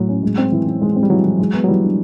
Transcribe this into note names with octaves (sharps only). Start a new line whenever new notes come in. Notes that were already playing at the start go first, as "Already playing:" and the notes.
Already playing: A2 F#3
C#4
G#3
C4
E3
E3
G#3
C4
G3
E3 F#3
E3
G#3
B3
F#3
E3 G3
D4